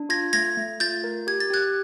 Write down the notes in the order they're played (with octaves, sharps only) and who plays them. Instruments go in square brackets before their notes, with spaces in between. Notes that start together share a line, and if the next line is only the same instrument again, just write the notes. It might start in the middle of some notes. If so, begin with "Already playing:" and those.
Already playing: [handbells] D4
[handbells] F4 [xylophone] G#6 A#6
[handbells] A3 [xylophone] G#6 A#6
[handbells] A3
[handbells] F4 [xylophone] G6 A6
[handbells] A#4
[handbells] G4 [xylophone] G#6
[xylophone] A6
[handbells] G4 [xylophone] F#6 G#6